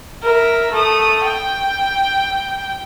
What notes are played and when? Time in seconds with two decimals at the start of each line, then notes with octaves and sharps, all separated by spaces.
0.23 A#4 E5
0.72 A3 D#6
1.25 G5